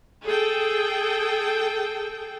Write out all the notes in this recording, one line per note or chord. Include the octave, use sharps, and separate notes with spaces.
G#4 A4 G5